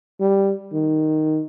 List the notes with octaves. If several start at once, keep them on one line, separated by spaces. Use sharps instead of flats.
G3
D#3